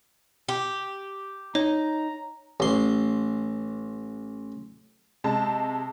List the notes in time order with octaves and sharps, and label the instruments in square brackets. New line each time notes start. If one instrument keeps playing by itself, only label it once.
[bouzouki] G4
[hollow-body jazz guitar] D#4 [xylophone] C#5 [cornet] A#5
[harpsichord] A1 C6
[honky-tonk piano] C3 G#3 A5